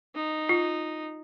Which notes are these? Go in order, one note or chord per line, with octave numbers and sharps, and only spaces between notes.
D#4
F4